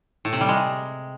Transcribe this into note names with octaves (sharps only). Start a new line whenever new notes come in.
A2
C3
G3
G#3